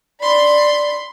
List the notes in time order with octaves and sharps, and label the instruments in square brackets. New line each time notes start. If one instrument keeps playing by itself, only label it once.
[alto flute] D5 [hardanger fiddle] B5 C6